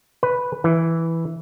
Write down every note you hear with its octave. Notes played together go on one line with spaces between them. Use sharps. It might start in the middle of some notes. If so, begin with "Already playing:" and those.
B4
E3